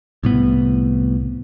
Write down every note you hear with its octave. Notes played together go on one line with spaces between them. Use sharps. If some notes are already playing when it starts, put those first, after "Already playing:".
C2 A2 B3